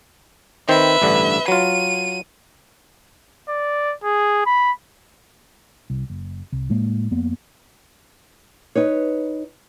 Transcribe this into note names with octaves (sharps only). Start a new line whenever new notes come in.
D#3 C4 B4 C5 E5
A1 G2 D3
F#3 F4 D#7
D5
G#4
B5
C2
F#1
C2
A2 G#3 A#3
F2 A#3 B3
D#4 B4 C#5